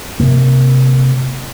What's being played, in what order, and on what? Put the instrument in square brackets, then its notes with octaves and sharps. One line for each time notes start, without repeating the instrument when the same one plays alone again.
[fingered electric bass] C3 A#3